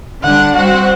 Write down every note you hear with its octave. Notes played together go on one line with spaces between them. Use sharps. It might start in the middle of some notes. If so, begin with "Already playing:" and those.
D3 G3 D4 F#5
G3 C4 F#4 C5 F#5